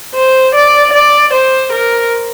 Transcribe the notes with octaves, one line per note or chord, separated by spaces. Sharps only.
C5
D5
D5
C5
A#4